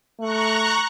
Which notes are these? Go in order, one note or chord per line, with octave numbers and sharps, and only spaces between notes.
A3 A#5 C#6 F#6